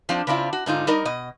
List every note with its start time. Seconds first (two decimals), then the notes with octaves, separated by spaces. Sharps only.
0.09 F3 C4 D4
0.27 C#3 C4 D4 E4 F4
0.53 F#4
0.66 G#2 D3 D#4 F4
0.87 G3 D#4 A#4 D#5
1.05 B2 D#5